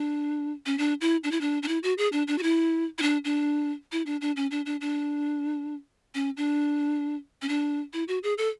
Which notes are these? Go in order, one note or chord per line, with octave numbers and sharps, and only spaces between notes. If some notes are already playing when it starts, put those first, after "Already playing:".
Already playing: D4
C#4
D4
E4
D4
E4
D4
D4
E4
F#4
G#4
D4
D4
F#4
E4
E4
D4
D4
E4
D4
D4
C#4
D4
D4
D4
C#4
D4
C#4
D4
E4
F#4
G#4
A4